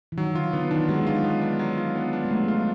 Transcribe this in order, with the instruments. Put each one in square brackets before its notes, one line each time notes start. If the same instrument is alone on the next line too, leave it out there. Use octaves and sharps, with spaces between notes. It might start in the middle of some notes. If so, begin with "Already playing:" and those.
[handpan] E3
[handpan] D#3 [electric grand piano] F#3
[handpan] D3 [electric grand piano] F4
[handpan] D3 [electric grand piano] B3
[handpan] D#3 [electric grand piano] D4
[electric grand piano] F#3 [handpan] G#3
[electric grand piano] F4
B3
D4
F#3
F4
B3
D4
[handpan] G#3
[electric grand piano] F#3 [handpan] A3
[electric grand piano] F4